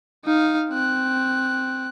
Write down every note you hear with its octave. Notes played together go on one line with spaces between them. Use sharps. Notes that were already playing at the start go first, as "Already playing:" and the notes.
D#4 F5
C4 F#6